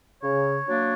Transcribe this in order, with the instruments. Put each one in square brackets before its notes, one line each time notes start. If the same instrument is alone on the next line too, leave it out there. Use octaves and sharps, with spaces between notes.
[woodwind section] C#3 C#5
F#3 A#3 D4